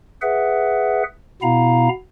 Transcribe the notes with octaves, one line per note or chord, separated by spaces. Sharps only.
G#4 B4 E5 F#5
B2 B3 E4 F5 A#5